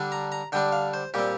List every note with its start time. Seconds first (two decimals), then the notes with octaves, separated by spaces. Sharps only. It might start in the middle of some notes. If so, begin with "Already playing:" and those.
Already playing: D3 G3 D4
0.12 A#5
0.32 A#5
0.52 D3 G3 D4 G5
0.73 F5
0.94 C5
1.14 A#2 G3 C4 G4